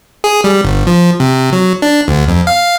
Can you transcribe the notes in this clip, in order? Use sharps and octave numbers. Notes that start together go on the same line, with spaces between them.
G#4
G3
G1
F3
C3
F#3
D4
D2
F2
F5